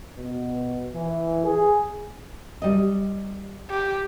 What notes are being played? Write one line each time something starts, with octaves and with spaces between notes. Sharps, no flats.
B2
E3
G#4
G3 D#5
G4